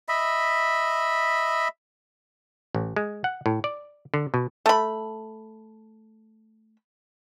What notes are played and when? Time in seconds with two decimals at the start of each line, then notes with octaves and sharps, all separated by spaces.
0.08 D#5 E5 B5
2.75 A1
2.96 G#3
3.24 F#5
3.46 A2
3.64 D5
4.14 D3
4.34 B2
4.66 A3 B5